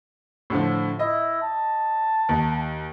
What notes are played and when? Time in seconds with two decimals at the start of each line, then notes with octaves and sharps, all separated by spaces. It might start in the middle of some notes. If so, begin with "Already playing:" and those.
0.50 A2 D3 F3
0.99 E4 D#5
1.42 A5
2.29 D#2